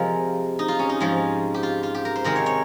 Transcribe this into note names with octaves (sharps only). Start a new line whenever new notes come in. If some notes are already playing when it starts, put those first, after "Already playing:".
Already playing: C3 F3 G#3 A#4
D#4
F4
C#4
D#4
G#2 F3 G#3
G4
F4
F4
G4
A#4
C5
C3 D#3 G#3 A#4
C#5
C#5